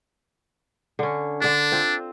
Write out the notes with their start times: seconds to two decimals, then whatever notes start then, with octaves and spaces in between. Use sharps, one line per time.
0.99 D3 C#4
1.42 D3 D4 A4
1.72 C4 F4